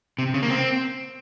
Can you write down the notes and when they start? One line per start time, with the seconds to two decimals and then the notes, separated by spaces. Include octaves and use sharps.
0.18 C3
0.34 C#3
0.43 A#3
0.50 C4